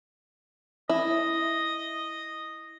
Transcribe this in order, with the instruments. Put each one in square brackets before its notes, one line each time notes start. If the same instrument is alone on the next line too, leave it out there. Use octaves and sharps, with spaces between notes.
[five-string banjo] E4 [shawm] D#5